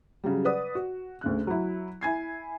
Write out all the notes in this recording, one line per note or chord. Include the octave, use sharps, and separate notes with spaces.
C#3 F#3 G3
B4 D5 F#5 D#6
F#4
D2 C#3 F#6
F#3 E4
E4 G#5 G#6 C7